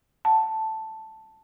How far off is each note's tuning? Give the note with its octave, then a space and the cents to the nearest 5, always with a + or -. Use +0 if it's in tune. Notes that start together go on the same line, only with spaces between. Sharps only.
F#5 +0 A5 +0